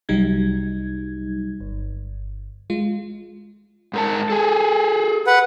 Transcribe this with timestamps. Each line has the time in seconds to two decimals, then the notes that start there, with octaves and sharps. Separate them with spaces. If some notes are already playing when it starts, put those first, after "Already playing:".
0.09 C2 F#3 G3 D#4 G#6
1.60 G1
2.70 G#3 F4
3.93 G#2 A#4 A5
4.30 G#4 A4
5.27 B4 F#5